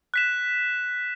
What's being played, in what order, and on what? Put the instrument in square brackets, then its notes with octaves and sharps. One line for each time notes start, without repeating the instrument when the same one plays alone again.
[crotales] F#6 B6 E7